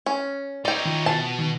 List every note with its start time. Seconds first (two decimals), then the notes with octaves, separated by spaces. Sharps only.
0.06 C#4
0.65 D#4 C#5 D5 G5
0.85 D#3 E4 F4
1.06 B2 A5
1.39 D#3